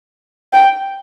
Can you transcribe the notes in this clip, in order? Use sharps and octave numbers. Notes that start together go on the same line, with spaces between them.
G5